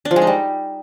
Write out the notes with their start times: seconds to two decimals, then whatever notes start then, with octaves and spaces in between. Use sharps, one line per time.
0.05 D4
0.11 F3
0.16 G#3
0.22 D#4
0.27 G3